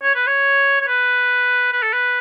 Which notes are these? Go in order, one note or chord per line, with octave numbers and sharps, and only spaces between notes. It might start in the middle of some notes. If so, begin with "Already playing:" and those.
C#5
B4
C#5
C#5
B4
B4
A4
B4